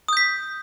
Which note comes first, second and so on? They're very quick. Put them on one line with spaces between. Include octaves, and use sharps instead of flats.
D#6 G6 B6